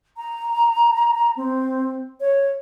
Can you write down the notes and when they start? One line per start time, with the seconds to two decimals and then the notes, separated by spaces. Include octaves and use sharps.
0.17 A#5
1.37 C4
2.21 C#5